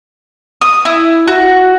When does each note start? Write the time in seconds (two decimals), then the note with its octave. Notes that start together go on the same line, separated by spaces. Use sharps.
0.61 D#6
0.85 E4
1.27 F#4